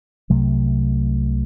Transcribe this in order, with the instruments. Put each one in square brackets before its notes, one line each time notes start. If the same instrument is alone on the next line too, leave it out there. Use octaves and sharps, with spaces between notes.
[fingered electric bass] C2 C3 F#3 A3